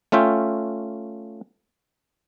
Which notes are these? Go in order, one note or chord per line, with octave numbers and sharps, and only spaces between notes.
A3 C#4 F4 E5 G5